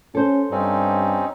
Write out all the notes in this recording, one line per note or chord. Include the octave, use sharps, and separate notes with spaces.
C#4 A4 C5
G2 C4 C#4 D#4